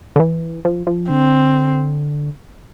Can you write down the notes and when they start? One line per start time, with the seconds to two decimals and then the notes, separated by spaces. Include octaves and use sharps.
0.16 D3
0.20 E3
0.65 F3
0.87 F3
1.09 D3 C4